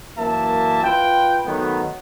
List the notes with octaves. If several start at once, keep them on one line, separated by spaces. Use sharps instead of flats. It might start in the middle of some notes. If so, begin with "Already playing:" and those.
F#2 E3 A#3 E5 A5
F4 B4 G5
D#3 F#3 A3 B3